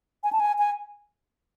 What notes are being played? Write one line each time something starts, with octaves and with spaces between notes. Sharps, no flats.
G#5
A5
G#5
G#5